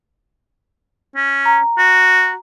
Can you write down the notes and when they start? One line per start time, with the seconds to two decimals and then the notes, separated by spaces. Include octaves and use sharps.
1.16 C#4
1.45 A#5
1.78 F#4